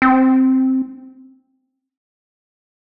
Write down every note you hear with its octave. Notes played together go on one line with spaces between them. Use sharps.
C4